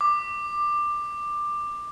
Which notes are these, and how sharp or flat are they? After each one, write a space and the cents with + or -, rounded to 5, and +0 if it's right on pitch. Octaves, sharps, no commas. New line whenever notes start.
D6 +15